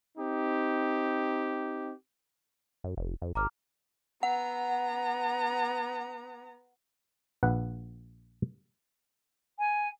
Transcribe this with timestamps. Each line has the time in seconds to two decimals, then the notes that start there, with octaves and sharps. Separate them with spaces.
0.18 C4 D#4 G4
2.84 F#2
2.97 F1
3.22 F2
3.35 G#1 A#5 D6 F6
4.23 B3 F#5 A#5
7.43 A#1 B4 F#5
9.59 G#5